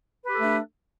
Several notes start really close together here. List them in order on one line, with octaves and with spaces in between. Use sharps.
B4 G4 A4 A3 D4